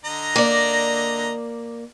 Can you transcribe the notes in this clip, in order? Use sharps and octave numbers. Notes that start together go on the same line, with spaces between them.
D3 D#5 A#5
A#3 D5